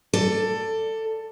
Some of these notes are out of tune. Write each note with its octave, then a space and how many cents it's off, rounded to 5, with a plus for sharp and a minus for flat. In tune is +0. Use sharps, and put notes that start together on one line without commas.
A4 +15 D5 +0